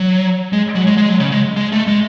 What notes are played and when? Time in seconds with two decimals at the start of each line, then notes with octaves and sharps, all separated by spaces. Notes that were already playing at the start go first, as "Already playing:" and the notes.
Already playing: F#3
0.53 G#3
0.75 F#3
0.87 G#3
0.97 G#3
1.08 F#3
1.20 C#3
1.32 G#3
1.57 G#3
1.72 A3
1.87 G#3